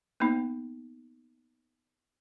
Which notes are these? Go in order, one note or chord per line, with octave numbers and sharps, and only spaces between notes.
A#3 B3 D#4